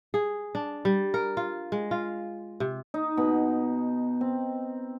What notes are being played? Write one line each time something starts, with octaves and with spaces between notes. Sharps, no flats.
G#4
D4
G3
A#4
F4
G#3
F4
C3
D#4
B2
C4